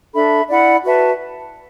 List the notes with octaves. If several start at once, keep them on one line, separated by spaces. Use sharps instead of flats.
D4 A4 E5 B5
E4 D5 F#5 B5
F#4 B4 E5 A5